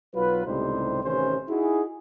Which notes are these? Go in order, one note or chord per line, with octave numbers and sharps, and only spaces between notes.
B1 F#3 F4 B4
C#2 A2 C3 G3 D#4 C5
A1 C3 D#3 E3 C#4 C5
D#4 E4 F#4 G#4